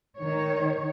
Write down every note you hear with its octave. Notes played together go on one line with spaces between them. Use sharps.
D#3 C#5